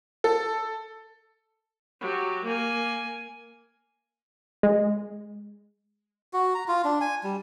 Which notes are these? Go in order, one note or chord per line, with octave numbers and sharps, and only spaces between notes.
A4
F#3 G4
A#3 G#5
G#3
F#4
A#5
F4
D4
G#5
G3